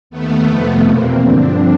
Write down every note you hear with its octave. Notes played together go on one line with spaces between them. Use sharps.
D#2 D#3 A3 B3
F2 C3 F3
E2 B2 A#3 C4
G2 D3 F3 C4 D4